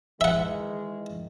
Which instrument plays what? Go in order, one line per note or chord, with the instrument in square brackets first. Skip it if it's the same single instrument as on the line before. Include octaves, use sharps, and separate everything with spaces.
[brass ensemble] D#3 E3 G#3 [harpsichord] E5 F#5